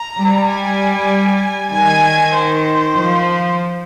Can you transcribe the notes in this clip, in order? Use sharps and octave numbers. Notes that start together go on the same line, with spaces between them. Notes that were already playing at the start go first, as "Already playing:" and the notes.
Already playing: A#5
G3
G#5
D#3 G#5
C5
F3